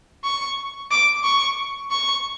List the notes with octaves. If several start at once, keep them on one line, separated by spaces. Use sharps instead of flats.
C#6
D6
C#6
C#6